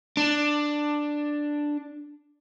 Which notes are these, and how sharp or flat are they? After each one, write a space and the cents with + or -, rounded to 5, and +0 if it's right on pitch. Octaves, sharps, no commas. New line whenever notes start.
D4 +5